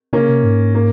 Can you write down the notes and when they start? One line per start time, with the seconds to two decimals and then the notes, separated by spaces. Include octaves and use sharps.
0.13 C#3 A#3 C#4
0.28 C3
0.44 G#2
0.75 A#3